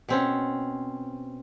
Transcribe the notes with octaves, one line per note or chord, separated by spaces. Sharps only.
B2 C4 C#4